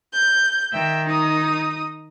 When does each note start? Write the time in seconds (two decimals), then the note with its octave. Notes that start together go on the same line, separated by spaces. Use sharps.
0.12 G6
0.72 D#3 E5 G5
1.06 D#4 D#6